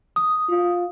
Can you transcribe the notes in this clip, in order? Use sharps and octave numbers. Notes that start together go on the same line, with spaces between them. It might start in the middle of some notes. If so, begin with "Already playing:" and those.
D#6
F4